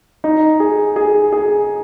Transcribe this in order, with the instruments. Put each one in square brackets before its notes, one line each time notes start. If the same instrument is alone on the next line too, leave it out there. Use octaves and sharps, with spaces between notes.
[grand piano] D#4
G#4
G#4
G#4